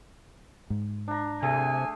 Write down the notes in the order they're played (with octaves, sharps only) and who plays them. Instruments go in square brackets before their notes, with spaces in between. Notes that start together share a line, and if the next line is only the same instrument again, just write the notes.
[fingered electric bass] G#2
[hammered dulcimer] D4 A#5
[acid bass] C3 [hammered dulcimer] A3 G#4 [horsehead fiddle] G#5